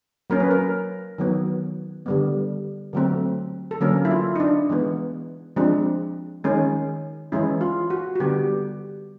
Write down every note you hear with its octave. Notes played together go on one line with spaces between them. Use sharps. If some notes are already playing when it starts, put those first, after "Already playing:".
F#3 A#3 C#4 A#4
B4
A#4
D#3 F#3 B3
D3 G3 B3
D3 F#3 A3 C4
A4
D3 F#3 A#3 C#4 A#4
E4
F4
D#4
D4
E3 G#3 B3
F3 G#3 C4 D4
D#3 G#3 C#4
E3 G#3 C#4 E4
F4
F#4
F#4
D3 G3 B3 G4